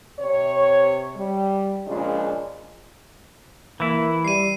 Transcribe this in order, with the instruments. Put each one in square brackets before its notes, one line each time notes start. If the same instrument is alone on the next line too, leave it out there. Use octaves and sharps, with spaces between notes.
[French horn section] C3 C#5
G3
A#2 C#3 F3 G#3 D4
[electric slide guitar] E3 E4 [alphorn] A#3
[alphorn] G3 [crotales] C7 D#7